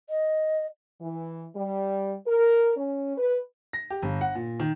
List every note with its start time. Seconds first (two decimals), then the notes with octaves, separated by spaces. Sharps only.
0.09 D#5
1.01 E3
1.55 G3
2.27 A#4
2.77 C#4
3.18 B4
3.73 A#6
3.90 G4
4.02 G1
4.21 F#5
4.35 A#2
4.60 D#3